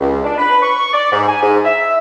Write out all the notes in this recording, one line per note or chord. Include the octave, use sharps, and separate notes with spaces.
C#2
D4
B4
C#6
D5
G#2
G#5
G#2
E5